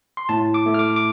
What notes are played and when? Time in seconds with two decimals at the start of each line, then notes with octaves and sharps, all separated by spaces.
0.17 C6
0.29 A2 A5
0.54 D6
0.66 A3
0.74 F6
0.79 D6
0.96 D6